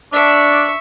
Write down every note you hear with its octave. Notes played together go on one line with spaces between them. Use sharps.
D4 E5 C#6